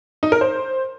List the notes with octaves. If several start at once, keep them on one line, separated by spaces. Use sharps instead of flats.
D#4
A#4
C5